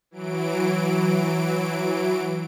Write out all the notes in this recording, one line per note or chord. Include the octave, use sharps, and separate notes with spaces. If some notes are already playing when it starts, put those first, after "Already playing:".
E3 F#3 D7